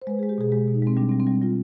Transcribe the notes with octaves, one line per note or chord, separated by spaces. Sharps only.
C5
G#3 B4
G#3 G#4
G4
B2 G#4
G#3 G4
B2
D#4
G#3 C4
G3 D4
C4
G3
C4
G3
G3 F4